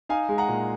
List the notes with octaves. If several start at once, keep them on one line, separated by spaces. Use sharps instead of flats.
D#4 F5 G#5
G#3
F#5 A#5
A#2